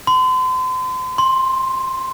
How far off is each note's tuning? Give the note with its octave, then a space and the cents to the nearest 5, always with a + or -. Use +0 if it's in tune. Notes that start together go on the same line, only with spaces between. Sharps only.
C6 -40
C6 +10